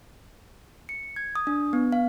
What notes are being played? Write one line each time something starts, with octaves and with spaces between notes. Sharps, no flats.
C#7
G#6
D#6
D4
B3
F5